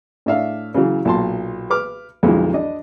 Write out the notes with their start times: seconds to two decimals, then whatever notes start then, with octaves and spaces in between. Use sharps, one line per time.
0.26 A2 D4 E5 F5
0.74 C#3 E3 F#3
1.05 B1 A#2 A5 C6
1.70 B4 D6 F6
2.23 B1 F2 D3 E3 F3 G#3
2.54 D4 D#5